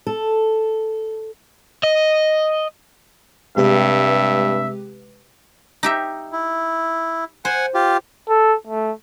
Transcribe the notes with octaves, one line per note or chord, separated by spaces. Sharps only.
A4
D#5
G2 C3 G#3 G4 B4 E5
D#4 G4 E5
E4
C5 F#5 G#5
F4 G4
A4
A3